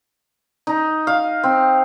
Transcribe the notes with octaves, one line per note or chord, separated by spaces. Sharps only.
D#4
F5
C4